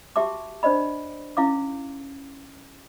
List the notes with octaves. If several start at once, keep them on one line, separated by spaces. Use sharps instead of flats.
F#4 G4 E5 A5 D6
D4 C5 D5 D#5 B5
C#4 E4 F5 D6